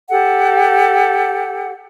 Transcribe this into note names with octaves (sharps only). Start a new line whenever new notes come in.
G4 A4 F#5